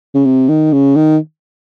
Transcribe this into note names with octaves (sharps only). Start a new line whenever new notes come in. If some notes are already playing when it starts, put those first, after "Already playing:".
C#3
C3
D#3
C#3
D#3